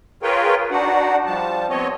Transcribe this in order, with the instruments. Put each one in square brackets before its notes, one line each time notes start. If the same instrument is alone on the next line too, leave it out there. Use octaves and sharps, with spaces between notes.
[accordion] F4 G#4 A#4 B4 C#5 G5
D4 D#4 F#4 F#5
F3 G3 A5
B3 C4 C#5 D#5